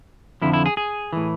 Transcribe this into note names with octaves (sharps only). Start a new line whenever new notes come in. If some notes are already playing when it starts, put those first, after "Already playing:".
F2 D3 F3 E4
E4
G#4
G#4
A2 E3